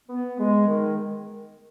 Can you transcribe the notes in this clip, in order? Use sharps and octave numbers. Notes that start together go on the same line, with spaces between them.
B3
G#3
D#3